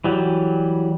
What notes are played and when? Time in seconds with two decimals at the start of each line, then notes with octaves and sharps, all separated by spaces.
0.04 E3 F#3 G3